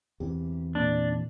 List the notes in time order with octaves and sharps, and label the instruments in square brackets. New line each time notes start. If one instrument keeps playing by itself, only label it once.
[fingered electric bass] E2 C3 E3 [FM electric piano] G4
[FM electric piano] A#2 A#3 [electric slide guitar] D4